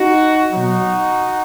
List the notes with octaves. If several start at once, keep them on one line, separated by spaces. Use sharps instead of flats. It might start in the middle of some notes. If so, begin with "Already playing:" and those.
Already playing: D#4 F#4
B2 F#3 D#4 F#4